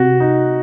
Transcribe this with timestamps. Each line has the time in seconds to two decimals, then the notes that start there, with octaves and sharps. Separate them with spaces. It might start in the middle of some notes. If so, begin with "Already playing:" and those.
Already playing: C3 F#4
0.20 D#4